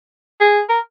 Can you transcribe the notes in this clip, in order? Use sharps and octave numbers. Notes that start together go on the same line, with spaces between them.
G#4
A#4